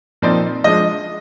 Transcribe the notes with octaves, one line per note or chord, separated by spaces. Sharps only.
A#2 F3 C4 D#4 D5
F3 G#3 D4 D#5